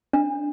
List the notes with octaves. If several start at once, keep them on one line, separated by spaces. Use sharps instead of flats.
D4